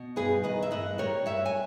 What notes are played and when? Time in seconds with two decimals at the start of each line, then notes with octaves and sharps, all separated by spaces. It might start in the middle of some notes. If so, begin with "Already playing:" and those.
Already playing: B2
0.16 G2 G#4 B4
0.44 D#3 B4 D#5
0.62 E5
0.71 G2 B4 D#5
0.98 G3 A#4 C#5
1.26 G2 C#5 E5
1.46 G#5